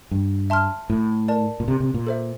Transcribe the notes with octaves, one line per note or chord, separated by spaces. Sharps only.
G2
E5 A5 C6 F6
A2
A#4 D5 A5
A#2
C3
C3
A#2
A4 C5 E5